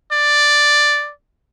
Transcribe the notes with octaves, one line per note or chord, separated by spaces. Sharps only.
D5